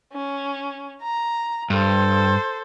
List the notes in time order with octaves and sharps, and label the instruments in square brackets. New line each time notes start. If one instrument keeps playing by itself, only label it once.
[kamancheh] C#4
A#5
[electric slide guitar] G2 [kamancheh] A4 C5